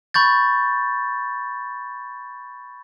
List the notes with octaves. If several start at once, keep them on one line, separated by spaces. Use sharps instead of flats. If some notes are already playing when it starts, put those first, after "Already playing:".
B5 C#6 G6 A6